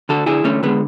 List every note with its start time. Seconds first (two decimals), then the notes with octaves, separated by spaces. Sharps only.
0.09 D3 F#4 A4
0.26 D3 E4 G#4
0.44 D3 A3 C#4
0.63 D3 G#3 B3